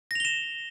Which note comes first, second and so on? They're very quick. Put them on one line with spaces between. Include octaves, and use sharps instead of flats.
A#6 F7 G7 E7